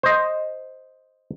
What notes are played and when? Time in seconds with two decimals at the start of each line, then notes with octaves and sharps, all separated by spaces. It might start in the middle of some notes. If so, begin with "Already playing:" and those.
0.03 C5 D#5